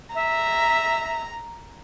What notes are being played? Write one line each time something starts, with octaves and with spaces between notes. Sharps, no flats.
E5 A#5